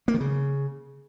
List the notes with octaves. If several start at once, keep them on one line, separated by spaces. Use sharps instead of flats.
A#3
D#3
C#3